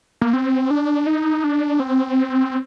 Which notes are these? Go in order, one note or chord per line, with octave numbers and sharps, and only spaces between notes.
A#3
C4
D4
D#4
D4
C4